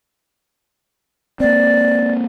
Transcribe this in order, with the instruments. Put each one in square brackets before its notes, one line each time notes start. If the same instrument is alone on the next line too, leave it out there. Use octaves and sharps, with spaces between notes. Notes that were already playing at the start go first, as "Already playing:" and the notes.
[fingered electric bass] A#3 C4 [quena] D5